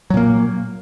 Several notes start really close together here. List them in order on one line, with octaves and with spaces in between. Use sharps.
F#3 A#2 A#3